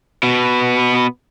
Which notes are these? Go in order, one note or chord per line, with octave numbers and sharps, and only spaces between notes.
B2 B3